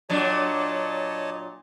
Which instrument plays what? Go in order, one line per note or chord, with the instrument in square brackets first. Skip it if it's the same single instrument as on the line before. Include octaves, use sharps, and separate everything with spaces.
[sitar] A#2 F#3 D4 [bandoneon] C#5 D#5 A5